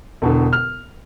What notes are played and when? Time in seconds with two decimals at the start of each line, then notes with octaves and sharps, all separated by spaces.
0.22 E1 B2 D3
0.53 F6